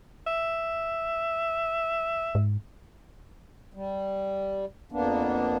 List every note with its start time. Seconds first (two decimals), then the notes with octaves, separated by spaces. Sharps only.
0.27 E5
2.35 G#2
3.74 G3
4.92 F2 A#3 B3 D4